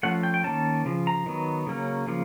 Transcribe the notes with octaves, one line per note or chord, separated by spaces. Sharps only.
F3 A3 C#4 F#5
G5
G5
D#3 G3 A#3 C#4 A5
C#3 F3
A#5
D#3 F#3 B3
C#3 F#3 A#3 C#4
C#3 F3 A#3